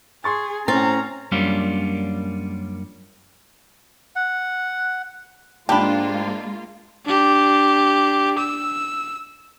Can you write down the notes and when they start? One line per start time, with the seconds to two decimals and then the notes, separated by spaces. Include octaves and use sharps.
0.24 G#4 C6 C#6 A6
0.68 A2 C4 C#4 A#5 A6
1.32 F#2 G3 A#3 C#4 D4 F4
4.16 F#5
5.69 G#2 G#3 A#3 D4 F4 G4 A5 B5
7.05 D4 G4
8.38 E6